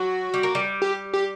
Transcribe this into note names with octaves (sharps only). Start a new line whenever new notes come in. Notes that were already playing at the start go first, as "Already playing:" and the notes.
Already playing: F#3 F#4
G3
A#3
G3
G4
G4